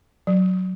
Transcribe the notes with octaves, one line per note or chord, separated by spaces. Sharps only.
F#3